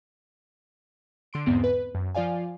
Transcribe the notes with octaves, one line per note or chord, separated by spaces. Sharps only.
D3 C6 D7
E2 G#2 B3 C4
B4
F#2
F3 F4 D5 F5 G#5